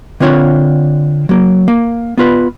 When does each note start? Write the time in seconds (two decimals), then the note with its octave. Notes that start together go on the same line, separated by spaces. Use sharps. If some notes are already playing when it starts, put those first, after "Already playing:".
0.20 D3 C4 D4 F4 C#5 F#5
1.29 F#3 A#3
1.68 A#3
2.18 B3 F4 B4